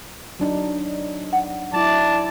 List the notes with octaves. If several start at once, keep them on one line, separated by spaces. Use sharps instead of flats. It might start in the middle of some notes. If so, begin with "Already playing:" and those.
F#3 D4 D#4
F#5
F#3 E4 D5 A5